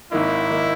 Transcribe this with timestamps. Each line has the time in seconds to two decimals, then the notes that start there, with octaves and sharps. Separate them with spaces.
0.12 G#1 G#2 D#3 A#3 D#4 E4
0.51 D#3 A#3 D#4